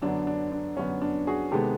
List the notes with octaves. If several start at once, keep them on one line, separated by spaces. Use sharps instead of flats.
F#2 D3 F#3 B3 D4
D4
D4
F#2 D3 F#3 B3 C#4
D4
F#4 G#4
C3 D#3 G#3 B3 G4 A4